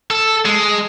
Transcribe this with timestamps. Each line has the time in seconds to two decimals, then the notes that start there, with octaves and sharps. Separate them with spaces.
0.11 A4
0.45 G#3